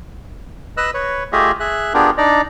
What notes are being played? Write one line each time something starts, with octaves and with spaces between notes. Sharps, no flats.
B4 D#5 E6 F#6
B4 C#5
A3 F4 G4 G#4 D#5 E5
G#4 E5 F#6
B3 D4 F4 G4 G#4 A#4
D4 D#4 D5 A#5